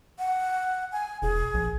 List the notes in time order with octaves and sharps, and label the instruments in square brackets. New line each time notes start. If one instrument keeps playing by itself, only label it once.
[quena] F#5
G#5
[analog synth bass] E1 [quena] G#4
[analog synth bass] A#1